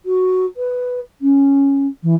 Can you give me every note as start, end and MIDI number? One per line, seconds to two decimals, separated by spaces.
0.05 0.46 66
0.57 1.00 71
1.21 1.87 61
2.03 2.15 52